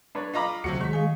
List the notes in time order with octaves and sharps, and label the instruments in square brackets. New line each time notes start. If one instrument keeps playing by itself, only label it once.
[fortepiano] D4 B4 C#5
[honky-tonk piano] F4 D#5 D6 [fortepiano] F5 A#5 B5
[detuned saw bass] D2 [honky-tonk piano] C3 F#3 C#7 [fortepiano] F#4
[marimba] D#3 [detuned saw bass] G#3 [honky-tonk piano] C#6 B6
[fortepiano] G#4 [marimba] F5 G#5